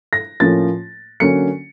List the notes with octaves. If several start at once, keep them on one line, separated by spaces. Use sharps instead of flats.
A#6
A2 F3 A#3 C#4 A6
D3 F#3 A#3 C#4 C#7